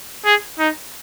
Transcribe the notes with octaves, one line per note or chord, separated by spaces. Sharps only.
G#4
D#4